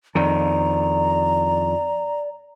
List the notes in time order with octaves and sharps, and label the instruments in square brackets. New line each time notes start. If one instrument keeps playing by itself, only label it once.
[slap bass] F2 D#3 [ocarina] D5 [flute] A#5